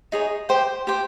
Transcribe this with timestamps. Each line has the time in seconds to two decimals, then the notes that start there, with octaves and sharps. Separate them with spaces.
0.12 D#4 G#4 C#5
0.49 G4 C5 G5
0.87 G4 C5 G5